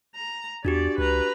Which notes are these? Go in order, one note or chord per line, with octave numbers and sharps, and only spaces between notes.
A#5
E2 D4 F#4 G4 D5
C#2 B4 A#5